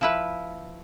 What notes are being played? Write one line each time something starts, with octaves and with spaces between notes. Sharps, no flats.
F3 E4 B4